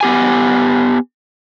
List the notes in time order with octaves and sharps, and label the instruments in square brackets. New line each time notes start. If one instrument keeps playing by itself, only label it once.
[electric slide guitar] B3 G4 G#5